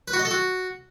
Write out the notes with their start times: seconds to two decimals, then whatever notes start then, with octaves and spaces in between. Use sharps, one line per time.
0.08 B4
0.13 F#4
0.19 D#5
0.25 A4
0.31 F#4